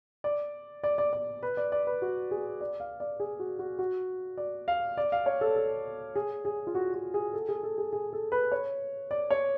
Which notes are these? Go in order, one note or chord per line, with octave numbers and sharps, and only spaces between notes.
D5
D5
D5
D5
B4
D5
D5
B4
F#4
G#4
D5
F5
D5
G#4
F#4
F#4
F#4
D5
F5
D5
F5
C#5
A4
A4
G#4
G#4
F4
F#4
F#4
G#4
A4
G#4
A4
G#4
G#4
A4
B4
C#5
D5
C#5